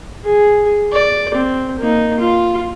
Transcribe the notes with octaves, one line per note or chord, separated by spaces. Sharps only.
G#4
D5
C4
A#3 D#4
F4